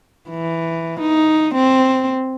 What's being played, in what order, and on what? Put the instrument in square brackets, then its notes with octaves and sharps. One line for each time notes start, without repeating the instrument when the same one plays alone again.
[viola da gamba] E3
D#4
C4